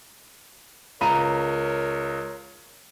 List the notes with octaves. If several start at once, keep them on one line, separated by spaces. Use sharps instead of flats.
C#2 A#4 C#5 A#5 B5 D#7